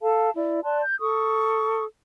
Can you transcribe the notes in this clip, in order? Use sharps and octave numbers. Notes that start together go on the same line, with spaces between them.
A4 F5 A5
E4 D5
D5 A5 C6 F#6
G6
A4 C#6 D#6